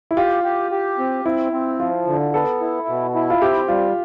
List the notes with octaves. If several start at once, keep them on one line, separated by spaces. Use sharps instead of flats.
E4
F4 G4
G4
G4
C4
C4 E4
C4
F3 F4
D3
B3 A4
E4
B2
E4
F4
C4 G4
G3 F4